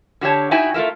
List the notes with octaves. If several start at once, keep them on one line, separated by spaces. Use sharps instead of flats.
D3 F#4 G4 C#5 A5
D#4 E4 F#4 G5 G#5
A3 F4 A#4 E5